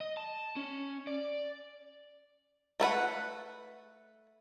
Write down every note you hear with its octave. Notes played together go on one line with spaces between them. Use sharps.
D#5
A5
C#4
D5
A3 A4 B4 F#5